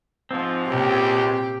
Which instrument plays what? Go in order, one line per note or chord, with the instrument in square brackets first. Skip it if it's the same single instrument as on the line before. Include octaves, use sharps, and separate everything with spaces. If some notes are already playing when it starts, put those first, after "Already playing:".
[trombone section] G#2 F3 [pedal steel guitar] C4
[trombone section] C#2 [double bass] A#2 [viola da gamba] G4